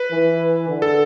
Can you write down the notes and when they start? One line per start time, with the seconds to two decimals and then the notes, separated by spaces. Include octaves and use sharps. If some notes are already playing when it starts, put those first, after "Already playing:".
Already playing: B4
0.11 E3
0.68 D3
0.82 A4